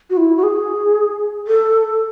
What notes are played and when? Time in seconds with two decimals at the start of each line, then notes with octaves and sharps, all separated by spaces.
0.10 F#4
0.17 E4
0.37 F#4
0.43 G#4
1.47 A4